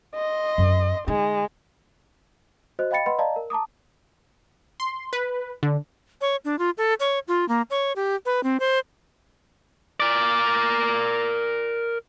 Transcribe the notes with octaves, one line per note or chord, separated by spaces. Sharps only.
D#5 C6
F#2
D3 G#3 D#4
F#4 C5 D#5 F#6
D#5 F5 G5 B5 A6 C#7
B4 D#5 F#5 B5 C6
D5 D#5 F5 A5 A#5
A#4
A5 A#5 D6 D#6
C6
B4
D3
C#5
D4
F4
A4
C#5
F4
A#3
C#5
G4
B4
C4
C5
A#4 D5